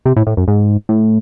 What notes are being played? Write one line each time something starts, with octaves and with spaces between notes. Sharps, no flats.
C3
A2
A2
F#2
G#2
A2